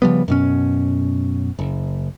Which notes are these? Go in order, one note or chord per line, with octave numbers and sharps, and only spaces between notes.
C#3 F3 G3 B3
F#2 B2 C#4
F#1